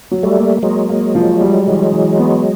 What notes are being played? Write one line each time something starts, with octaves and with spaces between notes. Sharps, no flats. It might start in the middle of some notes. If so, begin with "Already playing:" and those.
F#3
G3 A3
A#3
F#3 G#3 A#3
A#3
F3
G3
E3
E3
B3